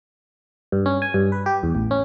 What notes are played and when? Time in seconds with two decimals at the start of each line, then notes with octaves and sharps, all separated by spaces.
0.72 G2
0.86 C#4
1.02 G#5
1.14 G2
1.32 B4
1.46 G4
1.63 E2
1.75 A1
1.91 C#4